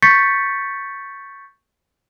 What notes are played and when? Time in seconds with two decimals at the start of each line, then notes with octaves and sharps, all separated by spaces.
0.02 C#6 G6 A6 B6 C#7